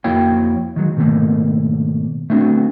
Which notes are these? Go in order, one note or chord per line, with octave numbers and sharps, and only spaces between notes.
F2 A#3 E4 F#4 C#5 G5
D#3 F#3 G#3
G#2 B2 D#3 F3 A3 A#3
A3 B3 C4 D4 F4 F#4